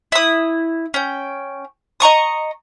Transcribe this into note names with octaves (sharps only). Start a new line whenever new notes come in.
E4 D#6
C#4 G5
D#5 A#5 C#6 D#6